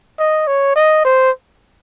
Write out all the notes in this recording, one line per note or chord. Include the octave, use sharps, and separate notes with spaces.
D#5
C#5
D#5
C5